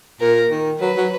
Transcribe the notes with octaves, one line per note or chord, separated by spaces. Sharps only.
A#2 A#4
D#3
F#3 B4
F#3